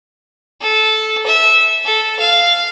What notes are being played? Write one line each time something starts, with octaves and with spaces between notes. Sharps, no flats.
A4
E5
A4
F5